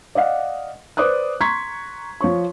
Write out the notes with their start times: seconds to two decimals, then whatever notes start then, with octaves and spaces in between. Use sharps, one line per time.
0.15 D5 D#5 F5 F#5
0.97 B4 C5 D5 D6 D#6 F#6
1.40 A#5 C6 C#6 G#6 B6
2.21 F3 C#5 C#6